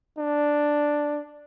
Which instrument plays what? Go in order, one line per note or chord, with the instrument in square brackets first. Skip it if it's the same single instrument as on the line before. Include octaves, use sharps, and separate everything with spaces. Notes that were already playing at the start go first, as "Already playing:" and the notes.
[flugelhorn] D4